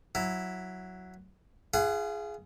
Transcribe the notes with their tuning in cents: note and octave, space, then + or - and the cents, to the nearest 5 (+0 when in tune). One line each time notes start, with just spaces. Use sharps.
F#3 +0 E4 +0
F4 -40 G#4 +5 F#5 +0